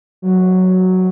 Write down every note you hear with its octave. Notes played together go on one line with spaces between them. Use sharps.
F#3